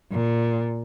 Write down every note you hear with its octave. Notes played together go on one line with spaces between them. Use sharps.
A#2